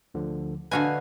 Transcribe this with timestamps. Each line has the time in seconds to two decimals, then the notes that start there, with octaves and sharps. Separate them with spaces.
0.14 D2 D3 F3
0.71 D3 F#4 B4 D#5 F5 G#5